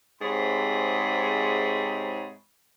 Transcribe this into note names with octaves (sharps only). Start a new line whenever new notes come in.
G#2 C3 G#4 C#5 B5